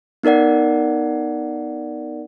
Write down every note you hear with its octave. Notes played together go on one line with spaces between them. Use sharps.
B3 D#4 A#4 D5 F#5